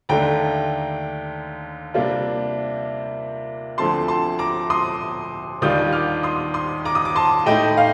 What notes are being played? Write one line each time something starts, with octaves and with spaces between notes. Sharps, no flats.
D#2 D3 A3 D4 G5 A#5
C3 G3 A#3 D4 F4
D2 D3 F3 A3 C4 A5 C6
A5 C6
A#5 D6
C6 D#6
D#2 D#3 G3 D4 F4 D#6 G6
D6 F6
C6 D#6
C6 D#6
A#5 D6
D#6
D6
A5 C6
A2 A3 D#4 D#5 G5
F5